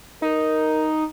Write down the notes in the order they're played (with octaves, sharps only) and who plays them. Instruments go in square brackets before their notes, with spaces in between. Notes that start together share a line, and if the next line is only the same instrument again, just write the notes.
[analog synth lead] D#4 [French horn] A#4